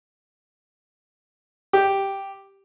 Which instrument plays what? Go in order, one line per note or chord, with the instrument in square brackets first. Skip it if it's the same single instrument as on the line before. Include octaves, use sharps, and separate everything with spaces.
[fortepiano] G4